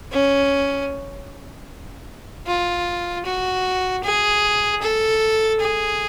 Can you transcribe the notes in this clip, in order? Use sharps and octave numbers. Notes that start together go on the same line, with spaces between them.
C#4
F4
F#4
G#4
A4
G#4